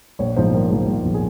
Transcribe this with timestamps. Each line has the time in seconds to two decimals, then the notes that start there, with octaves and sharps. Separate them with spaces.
0.19 A#1 C#5
0.36 G#2 F3 C5
0.53 A#1 A#4
0.70 G#2 F3
0.87 A#1
1.04 G#2 F3
1.14 G#4